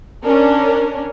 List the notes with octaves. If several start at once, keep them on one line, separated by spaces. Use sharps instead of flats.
C#4 D4 A#4